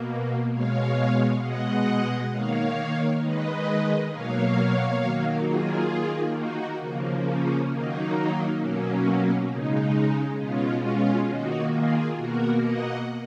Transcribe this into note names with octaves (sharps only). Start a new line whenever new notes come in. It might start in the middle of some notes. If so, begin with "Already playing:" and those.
Already playing: B2 A#3
B2 G#3 C#5 F5
B2 G#3 D#5 F#5
D#3 A#3 C#5 F5
D#3 G#3 B4 D#5
B2 F#3 A#3 C#5 F5
D#3 F#3 A#3
F4 G#4
D#3 A#3
D#4 F#4
C#3 F3 A#3
C#4
D#3 F#3 A#3 D#4
B2 F#3 A#3 C#4
C#3 G#3 D#4
B2 G#3 C#4 F4
C#4 F4
D#3 A#3 D#4 F#4
F4 G#4
B2 A#3 F#4 A#4
D#5 F#5